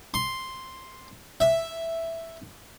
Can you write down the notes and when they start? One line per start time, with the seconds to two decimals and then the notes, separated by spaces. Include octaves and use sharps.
0.14 C6
1.40 E5